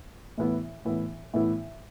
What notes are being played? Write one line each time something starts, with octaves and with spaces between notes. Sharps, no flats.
A2 E3 B3 E4
A2 E3 B3 E4
A2 E3 B3 E4